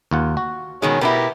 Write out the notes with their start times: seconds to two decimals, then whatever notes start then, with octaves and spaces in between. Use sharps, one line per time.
0.11 D#2 F4 F#5
0.37 F#4
0.82 B2 D#3 F#3 G#3 C#4
1.01 B2 B3 D4 E4 G4 A#4